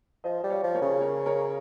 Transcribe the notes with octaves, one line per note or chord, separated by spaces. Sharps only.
F3 C5 D#5
G3
C#5 F5
F3
A#4 C#5
C#3
A#4 C#5
A#4 C#5